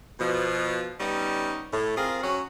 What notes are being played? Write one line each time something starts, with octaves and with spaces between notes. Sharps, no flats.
B2 F3
G3 B3 C#4 D#4
A2
C4 F4 G#4 A#4
F#3 C#4 F#4